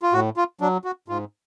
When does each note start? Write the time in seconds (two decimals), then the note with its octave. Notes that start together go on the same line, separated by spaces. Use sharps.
0.02 F4
0.13 A2 F#4
0.37 F4
0.61 F#3 D4
0.84 F#4
1.08 G#2 F4